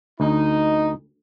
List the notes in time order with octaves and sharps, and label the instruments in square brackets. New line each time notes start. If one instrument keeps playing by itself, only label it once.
[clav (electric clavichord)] D2 [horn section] D#4